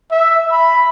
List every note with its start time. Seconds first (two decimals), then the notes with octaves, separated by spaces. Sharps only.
0.11 E5
0.52 B5